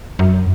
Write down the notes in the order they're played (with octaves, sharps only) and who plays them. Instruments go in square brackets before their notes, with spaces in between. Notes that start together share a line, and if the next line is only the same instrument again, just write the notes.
[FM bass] F#2